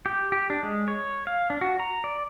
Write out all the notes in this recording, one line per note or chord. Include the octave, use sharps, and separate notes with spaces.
G4
G4
D4
G#3
C#5
F5
D4
F#4
A#5
D5